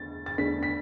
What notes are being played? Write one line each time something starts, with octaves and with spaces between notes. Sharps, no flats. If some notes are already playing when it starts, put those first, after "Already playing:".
Already playing: E2 D3 A3 A6
A6
E2 D3 A3 D4 B6
B6